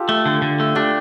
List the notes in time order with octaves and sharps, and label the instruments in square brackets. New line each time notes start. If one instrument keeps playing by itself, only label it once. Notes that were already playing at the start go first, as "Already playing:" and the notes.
Already playing: [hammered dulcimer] F4 G4 A4
[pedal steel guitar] A3
D3
D3
A3
[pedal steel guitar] D4 [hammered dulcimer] G4